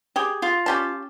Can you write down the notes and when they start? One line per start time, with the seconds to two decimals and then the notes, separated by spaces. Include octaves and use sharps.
0.16 G4 G#4
0.42 F4
0.66 C#4 G4 A5